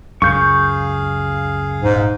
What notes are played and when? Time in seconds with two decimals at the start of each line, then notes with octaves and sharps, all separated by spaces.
0.22 C#2 F#2 G#4 F5 C#6 G6
1.83 D#1 G#2